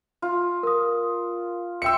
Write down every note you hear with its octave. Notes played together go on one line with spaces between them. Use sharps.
F4
A#4 D#6
E5 G5 C6 E6 C#7